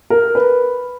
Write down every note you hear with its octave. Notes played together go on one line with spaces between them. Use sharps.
A#4
B4